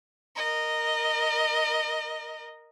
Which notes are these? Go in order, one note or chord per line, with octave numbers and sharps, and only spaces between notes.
A#4 D#5